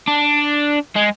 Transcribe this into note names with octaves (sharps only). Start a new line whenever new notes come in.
D4
G#3